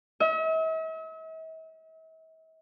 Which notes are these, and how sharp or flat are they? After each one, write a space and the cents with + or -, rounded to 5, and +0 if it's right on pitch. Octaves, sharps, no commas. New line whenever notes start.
E5 -45